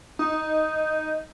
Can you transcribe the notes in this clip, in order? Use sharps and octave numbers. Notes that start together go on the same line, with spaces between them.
D#4